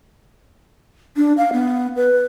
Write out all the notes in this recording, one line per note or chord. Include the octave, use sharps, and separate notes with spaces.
D4
F5
B3
B4